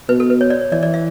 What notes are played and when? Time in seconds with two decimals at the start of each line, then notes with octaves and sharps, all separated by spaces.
0.09 B2 B4
0.20 A4
0.30 B4
0.41 C#5
0.50 D5
0.61 C#5
0.72 E3 D5
0.83 D5
0.94 E5